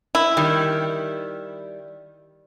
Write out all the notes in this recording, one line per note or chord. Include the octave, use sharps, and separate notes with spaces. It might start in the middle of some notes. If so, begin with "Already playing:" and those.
E4
D#3 G3